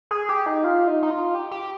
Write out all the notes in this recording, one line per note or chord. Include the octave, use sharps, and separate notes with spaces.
G#4
G4
D#4
F4
D#4
D#4
F4
G4
G4